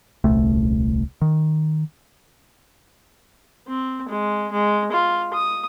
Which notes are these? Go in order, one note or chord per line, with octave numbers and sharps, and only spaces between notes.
D#1 C2 A3
D#3
C4
G#3
G#3
F4
D#6